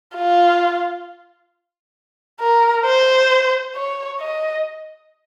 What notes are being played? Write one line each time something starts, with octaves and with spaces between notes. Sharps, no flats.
F4
A#4
C5
C#5
D#5